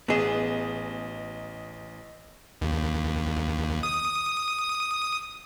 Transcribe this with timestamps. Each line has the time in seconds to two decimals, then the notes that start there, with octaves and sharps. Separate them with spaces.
0.08 A1 B3 G#4 D#5 E7
2.61 D#2
3.83 D#6